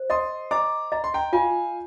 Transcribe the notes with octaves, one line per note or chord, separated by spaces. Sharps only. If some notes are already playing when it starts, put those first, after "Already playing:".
Already playing: C5
D#5 C6 D#6
D#5 A#5 D6
D#5 A#5
C6
G5 A#5
F4 F5 G#5